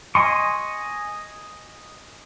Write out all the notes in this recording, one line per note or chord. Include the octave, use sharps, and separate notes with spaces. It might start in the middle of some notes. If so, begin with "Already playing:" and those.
D#5 G#5 C6 C#6